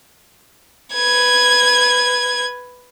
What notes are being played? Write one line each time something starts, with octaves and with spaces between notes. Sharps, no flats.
B4 G#6